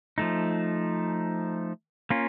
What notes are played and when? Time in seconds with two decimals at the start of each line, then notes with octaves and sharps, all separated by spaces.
0.18 F3 A3 D#4
2.10 A#3 C#4 F4